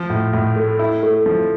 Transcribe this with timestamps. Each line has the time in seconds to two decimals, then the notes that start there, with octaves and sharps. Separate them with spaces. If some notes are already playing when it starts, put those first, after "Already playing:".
Already playing: F3
0.10 A2
0.33 A2
0.56 A3
0.79 E4
1.03 A3
1.26 F3